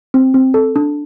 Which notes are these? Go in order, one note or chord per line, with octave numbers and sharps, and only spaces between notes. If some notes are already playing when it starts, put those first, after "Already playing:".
C4
C4
A4
D4